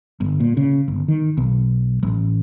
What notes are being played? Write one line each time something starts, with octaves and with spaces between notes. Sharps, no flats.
G1
A#2
C#3
G1
D#3
B1
A1